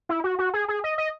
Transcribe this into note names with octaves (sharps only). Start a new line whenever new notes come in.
E4
F#4
F#4
G#4
G#4
D#5
D#5